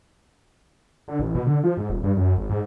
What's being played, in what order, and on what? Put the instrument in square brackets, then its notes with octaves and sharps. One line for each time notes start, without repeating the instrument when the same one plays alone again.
[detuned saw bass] D3
A1
B2
D3
F3
G#2
D#1
G2
F#2
G#1
G#2